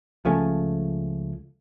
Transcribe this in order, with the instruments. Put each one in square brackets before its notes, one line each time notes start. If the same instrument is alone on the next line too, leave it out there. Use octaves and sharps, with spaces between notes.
[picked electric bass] C#2 F3 A3 C#4